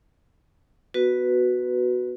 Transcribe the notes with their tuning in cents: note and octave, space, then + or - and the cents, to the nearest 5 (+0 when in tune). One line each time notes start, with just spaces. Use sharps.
B3 +0 F#4 +0 B4 +0